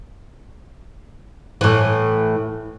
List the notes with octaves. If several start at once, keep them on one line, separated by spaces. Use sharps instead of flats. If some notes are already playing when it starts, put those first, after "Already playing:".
A2 E3